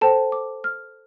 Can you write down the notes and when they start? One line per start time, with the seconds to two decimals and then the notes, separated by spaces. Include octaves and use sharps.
0.01 A4 C5 G5 A5
0.32 D6
0.64 F6